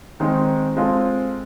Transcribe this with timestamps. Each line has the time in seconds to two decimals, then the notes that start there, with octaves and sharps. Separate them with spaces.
0.20 D#3 G#3 C4 D#4
0.77 G#3 C4 F4 A4